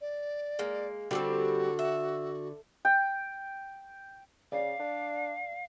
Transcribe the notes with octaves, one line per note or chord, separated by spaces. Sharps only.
D5
G#3 A#3
D3 G3 A#3 C4 F#4
E5
G5
C#3 D5 F5
D4